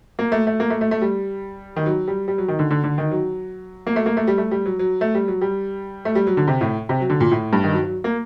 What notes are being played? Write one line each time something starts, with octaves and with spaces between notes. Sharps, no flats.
A#3
A3
A3
A#3
A3
A3
A3
G3
D#3
F#3
G3
G3
F#3
D#3
D3
D3
D3
D#3
F#3
A#3
A3
A#3
A3
G3
A3
G3
F#3
F#3
A3
G3
F#3
G3
A3
G3
F#3
D3
C3
A2
C3
F#3
D3
A#2
A2
G2
D#3
F#3
F#3
A#3